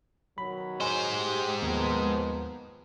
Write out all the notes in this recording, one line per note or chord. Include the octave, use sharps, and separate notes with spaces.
B2 D#3 F#3 B5
G#3 C5 D#5 G#5
G4
D#2 D#3 F3 B3 A#5